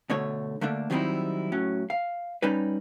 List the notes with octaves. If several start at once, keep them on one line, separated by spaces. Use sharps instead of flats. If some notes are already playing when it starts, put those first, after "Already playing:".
B2 D3 A3 C#5
D3 A3 A#3 D4
D#3 F#3 G3 C4 D#4 E4
A2 F#3 C#4
F5
G3 C#4 D#4 B4